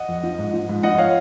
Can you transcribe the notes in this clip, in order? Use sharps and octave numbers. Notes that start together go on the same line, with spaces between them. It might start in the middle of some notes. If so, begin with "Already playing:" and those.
Already playing: D#5 F#5
F2
F3
G#2
F3
G#2
F3 D#5 F#5
C#5 F5